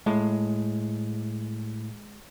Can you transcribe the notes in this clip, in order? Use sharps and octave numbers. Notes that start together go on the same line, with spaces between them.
A2 G#3